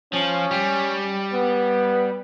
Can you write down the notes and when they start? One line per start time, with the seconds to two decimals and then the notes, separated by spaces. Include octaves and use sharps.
0.13 F3 C#4
0.51 G3
1.33 B3